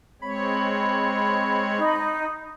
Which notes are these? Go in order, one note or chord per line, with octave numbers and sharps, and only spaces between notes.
G#3 C4 C#5 B5
D#4